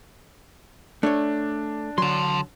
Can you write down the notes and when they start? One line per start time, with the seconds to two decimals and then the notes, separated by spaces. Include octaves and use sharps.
1.03 A3 D4 C#5
1.98 D3 F#3 A5 C6